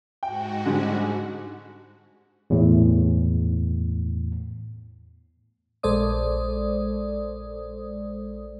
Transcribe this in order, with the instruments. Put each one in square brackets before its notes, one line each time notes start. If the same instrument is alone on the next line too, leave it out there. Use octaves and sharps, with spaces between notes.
[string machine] G#2 F#4 [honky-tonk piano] G5
[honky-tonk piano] D3 G3 G#3
[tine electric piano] E2 A2
[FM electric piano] A#1 G#3 A4 C5 D5 D#6